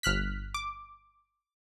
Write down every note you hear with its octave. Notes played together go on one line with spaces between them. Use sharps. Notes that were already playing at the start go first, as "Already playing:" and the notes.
G1 F6 F#6 B6
D6